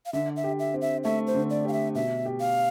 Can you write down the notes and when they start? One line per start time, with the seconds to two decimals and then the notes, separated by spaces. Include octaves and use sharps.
0.06 F5
0.13 D3 E5
0.36 E5
0.44 G4
0.59 E5
0.74 C4
0.81 E5
1.04 A3 E5
1.27 C5
1.35 D3
1.50 D5
1.65 G4 F5
1.73 E5
1.95 B2 E5
2.25 G4
2.40 F5